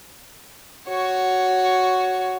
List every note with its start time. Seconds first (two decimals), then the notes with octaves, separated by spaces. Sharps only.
0.88 F#4 C#5